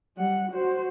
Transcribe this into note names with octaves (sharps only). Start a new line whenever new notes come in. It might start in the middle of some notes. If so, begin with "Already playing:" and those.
G3 F#5
F#4 C5